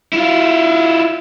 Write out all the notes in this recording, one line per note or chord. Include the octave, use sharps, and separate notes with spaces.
E4 F4